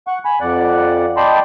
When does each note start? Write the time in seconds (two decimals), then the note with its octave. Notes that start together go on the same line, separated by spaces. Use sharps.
0.07 F#5 C#6
0.25 G#5 B5
0.41 F2 D5 F#5
1.17 D5 D#5 G5 A5 B5 C6